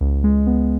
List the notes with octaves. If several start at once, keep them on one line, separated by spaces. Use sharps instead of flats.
C#2
G#3
B3